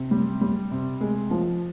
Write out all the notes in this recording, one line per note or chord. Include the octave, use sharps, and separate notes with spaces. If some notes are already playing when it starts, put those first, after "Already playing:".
Already playing: C3
G3
G3
C3
G#3
F3